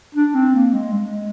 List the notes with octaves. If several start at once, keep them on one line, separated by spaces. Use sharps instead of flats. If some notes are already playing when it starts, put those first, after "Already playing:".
D4
C4
A#3
G#3
G#3